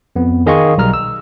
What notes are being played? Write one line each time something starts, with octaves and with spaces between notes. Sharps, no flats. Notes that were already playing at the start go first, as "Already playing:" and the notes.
F2 B3
D#3 G#4 D#5 F5 C6 C#6
B1 G3 A#5 F6
E6